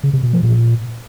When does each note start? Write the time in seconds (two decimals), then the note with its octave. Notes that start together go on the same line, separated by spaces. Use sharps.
0.04 C#3
0.13 C3
0.23 B2
0.33 F3
0.43 A#2